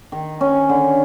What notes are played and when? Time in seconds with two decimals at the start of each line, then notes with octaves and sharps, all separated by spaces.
0.12 D#3
0.41 C#4
0.69 D3